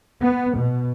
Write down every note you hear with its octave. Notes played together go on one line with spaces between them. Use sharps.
B3
B2